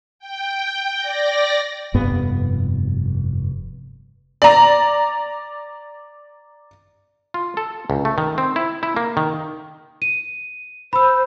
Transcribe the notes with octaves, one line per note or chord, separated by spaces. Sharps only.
G5
D5 A#6
F1 G2 B3
D5 A#5
F4
A4
C#2
A3
D#3
C4
E4
E4
A#3
D#3
D#7
C5 B5 E6